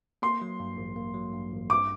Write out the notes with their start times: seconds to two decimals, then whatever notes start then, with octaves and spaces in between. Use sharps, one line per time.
0.22 A#3 C6
0.42 F#3
0.60 G2
0.77 A1
0.96 A#3
1.14 F#3
1.33 G2
1.52 A1
1.70 G2 D6